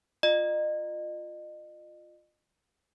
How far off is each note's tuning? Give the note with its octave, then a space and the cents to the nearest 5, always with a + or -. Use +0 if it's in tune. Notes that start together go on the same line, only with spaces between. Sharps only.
F4 +0 D#5 -35